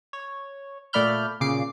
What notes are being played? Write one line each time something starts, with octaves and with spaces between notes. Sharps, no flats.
C#5
A#2 A3 D5 B5 F6 G6
A#2 C#3 D6 C7 D7